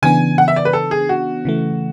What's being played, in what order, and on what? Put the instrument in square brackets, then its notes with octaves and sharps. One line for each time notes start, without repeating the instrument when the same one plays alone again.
[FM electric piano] C#3 E3 B3 D4 [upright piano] G#5
[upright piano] F#5
E5
D5
B4
A4
G#4
F#4
[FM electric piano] C#3 E3 A3